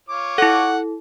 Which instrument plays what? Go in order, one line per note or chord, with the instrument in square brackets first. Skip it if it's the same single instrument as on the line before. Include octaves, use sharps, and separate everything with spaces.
[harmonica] F4 C#5 D6
[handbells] E4 A4 [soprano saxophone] F#5